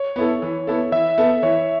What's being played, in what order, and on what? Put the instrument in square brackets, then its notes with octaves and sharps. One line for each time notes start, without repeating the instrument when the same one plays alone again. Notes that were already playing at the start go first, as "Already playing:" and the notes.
Already playing: [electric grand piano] C#5
[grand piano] B3 E4 A4
E3
B3 E4 A4
[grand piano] E3 [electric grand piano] E5
[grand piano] B3 A4
[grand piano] E3 [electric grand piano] C#5